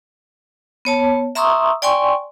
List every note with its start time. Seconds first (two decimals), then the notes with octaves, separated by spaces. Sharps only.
0.85 B3 C#5 A5
1.35 E5 A#5 C6 C#6 D#6 E6
1.82 D5 G5 G#5 C6 C#6